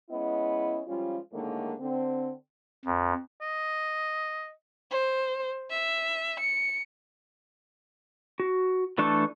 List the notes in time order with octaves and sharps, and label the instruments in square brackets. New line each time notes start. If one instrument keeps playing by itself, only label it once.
[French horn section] G#3 B3 C#4 E4 D#5
F3 G3 G#3 C#4 F4
A2 D3 D#3 G#3 A#3
D3 C4
[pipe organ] F2
[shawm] D#5
[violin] C5
E5
C#7
[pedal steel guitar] F#4
E3 A3 D4 A4 C#6